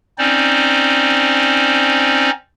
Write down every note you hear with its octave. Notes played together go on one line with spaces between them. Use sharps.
C4 C#4 D#4 C5 D5